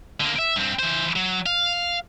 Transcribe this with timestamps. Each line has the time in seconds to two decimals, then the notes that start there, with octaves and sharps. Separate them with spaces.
0.20 D3 A#3
0.39 E5
0.56 G2 C4
0.79 E3 C5
1.16 F#3
1.46 F5